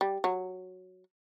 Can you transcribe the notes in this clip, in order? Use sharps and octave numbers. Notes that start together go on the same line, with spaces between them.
G3
F#3